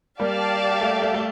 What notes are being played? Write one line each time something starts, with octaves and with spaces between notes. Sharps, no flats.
G3 A#3 G4 D5 F5 A5
A3
A3
A3